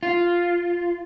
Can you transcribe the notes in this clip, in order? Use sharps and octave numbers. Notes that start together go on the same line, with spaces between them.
F4